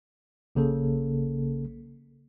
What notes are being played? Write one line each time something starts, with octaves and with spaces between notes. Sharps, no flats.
A#1 C#3 A#3 A4